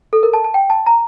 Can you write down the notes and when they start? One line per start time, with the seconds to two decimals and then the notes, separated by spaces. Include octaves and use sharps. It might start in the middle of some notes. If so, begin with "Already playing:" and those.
0.13 A4
0.23 A#4
0.33 A5
0.44 A5
0.54 G5
0.70 A5
0.86 A#5